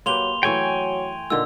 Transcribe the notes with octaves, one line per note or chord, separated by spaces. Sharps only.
F#3 A#3 G4 B4 C6 F7 G7
E3 F#3 A3 C#5 G5 G#5 C#6
A#2 D3 D#3 E6